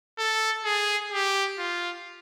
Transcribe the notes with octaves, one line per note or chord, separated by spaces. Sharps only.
A4
G#4
G4
F4